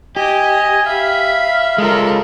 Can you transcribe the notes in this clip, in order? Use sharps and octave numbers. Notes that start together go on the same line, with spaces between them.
G4 D#5 G#5
E5 F5 B5
G#3 F4 A4 A#4